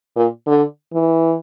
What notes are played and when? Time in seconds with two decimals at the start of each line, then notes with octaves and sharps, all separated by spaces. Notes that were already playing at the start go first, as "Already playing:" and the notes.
0.16 A#2
0.47 D3
0.93 E3